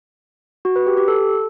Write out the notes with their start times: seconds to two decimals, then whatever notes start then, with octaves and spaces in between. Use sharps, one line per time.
0.65 F#4
0.76 B4
0.86 G4
0.97 G4
1.08 A4